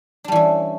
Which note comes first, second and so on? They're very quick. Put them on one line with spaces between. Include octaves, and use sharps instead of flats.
D4 G3 E3 C#4